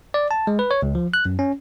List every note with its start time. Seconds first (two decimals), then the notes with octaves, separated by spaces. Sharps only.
0.14 D5
0.31 A5
0.47 G#3
0.59 B4
0.71 C#5
0.82 C#2
0.95 F3
1.14 F#6
1.25 F#2
1.39 C#4